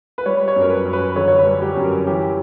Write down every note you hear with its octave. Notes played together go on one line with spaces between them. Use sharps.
B4
G3 C#5
C#5
F#2
A#4
B4
F#2
B4
D3 C#5
C#5
B4
G3
G4
F#2
A#4
E3 G4